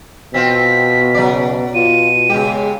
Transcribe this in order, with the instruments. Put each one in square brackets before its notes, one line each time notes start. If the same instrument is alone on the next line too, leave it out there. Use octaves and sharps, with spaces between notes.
[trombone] B2 [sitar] C4 F4 [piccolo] B6
[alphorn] C#3 [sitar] F#3 D5
[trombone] B2 [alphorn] F4 [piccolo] D#7
[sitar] C#3 G4 [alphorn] G#3